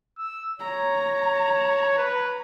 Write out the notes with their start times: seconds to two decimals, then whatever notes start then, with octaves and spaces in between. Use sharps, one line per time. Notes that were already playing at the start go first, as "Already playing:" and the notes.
0.18 E6
0.60 C#5 A#5
1.98 B4